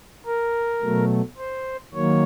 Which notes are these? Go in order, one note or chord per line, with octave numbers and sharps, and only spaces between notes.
A#4
B2 F#3 A3
C5
D#3 F#3 A#3 C#5